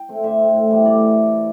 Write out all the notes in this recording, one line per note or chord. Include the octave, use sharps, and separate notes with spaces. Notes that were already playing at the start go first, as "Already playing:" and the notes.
Already playing: G5
A3 C4
D3 E5
C4
A3
A2
E3 G3 B3
A2 D5
E3